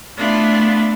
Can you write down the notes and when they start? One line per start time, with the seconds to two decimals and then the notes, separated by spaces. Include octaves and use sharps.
0.17 A3 B3 D4 E4 F4